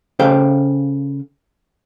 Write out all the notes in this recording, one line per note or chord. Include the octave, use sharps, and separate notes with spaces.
C#3 A4 C5 F5 G5